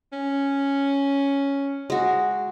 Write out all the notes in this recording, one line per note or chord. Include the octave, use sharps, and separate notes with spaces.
C#4
G#3 F#4